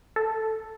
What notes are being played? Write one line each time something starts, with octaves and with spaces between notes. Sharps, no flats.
A4